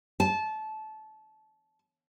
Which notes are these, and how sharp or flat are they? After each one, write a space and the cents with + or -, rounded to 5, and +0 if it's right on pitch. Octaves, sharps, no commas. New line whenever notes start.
A5 -20